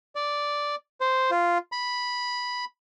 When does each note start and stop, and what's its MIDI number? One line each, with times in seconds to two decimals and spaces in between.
0.15 0.75 74
1.01 1.31 72
1.31 1.58 65
1.72 2.65 83